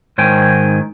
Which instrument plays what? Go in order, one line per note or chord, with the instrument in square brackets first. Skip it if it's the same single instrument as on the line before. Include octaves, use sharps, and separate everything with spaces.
[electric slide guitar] G#2 D#3 C5 C#5 G5 G#5